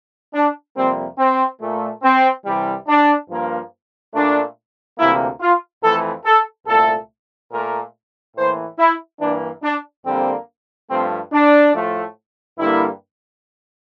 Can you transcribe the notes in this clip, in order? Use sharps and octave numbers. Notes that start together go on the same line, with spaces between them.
D4
F2 C3 G3 A#3 C4
C4
A#2 A3
C4
C2 C3 E3 G3
D4
G2 F3 A#3
A#2 A3 D4
D2 C3 E3 A#3 E4
F4
F2 E3 A3 A4
A4
C2 A#2 A3 A4
A#2 A3 A#4
A2 E3 A#3 C5
E4
G2 E3 A#3 D4
D4
F2 D3 G3 A#3 C4
G2 F3 A3 C4
D4
A2 F3 A3
G2 D3 G3 A#3 E4